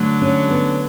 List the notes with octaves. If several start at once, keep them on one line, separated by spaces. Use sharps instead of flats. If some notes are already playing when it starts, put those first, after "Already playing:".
Already playing: D3 F#3 A3
C#4
B3